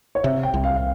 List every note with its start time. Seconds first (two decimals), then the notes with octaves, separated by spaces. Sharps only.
0.15 C#5
0.24 C3 E5
0.43 G5
0.54 C2
0.64 F5
0.76 F5